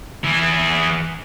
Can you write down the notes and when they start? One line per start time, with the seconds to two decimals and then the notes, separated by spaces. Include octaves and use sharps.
0.24 E3 G#4